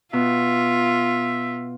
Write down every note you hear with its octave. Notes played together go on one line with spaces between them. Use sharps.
B2 F4 E5